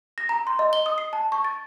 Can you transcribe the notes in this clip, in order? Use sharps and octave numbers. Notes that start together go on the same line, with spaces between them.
A#6
A#5
C6
D#5
G7
D#6
C7
A5
C#6
A6